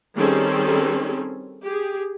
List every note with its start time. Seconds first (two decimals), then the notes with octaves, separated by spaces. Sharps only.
0.16 D#3 G3 C4 C#4 G#4 A4
1.63 G4 G#4